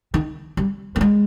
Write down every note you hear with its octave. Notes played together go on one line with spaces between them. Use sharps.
D#3
G3
A#3
G#3